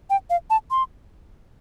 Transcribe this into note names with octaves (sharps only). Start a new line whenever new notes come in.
G5
F5
A5
C6